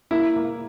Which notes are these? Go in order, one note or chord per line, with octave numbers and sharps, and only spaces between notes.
A#3 E4
A#3